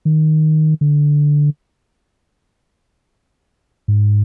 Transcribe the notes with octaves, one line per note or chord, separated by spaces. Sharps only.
D#3
D3
G#2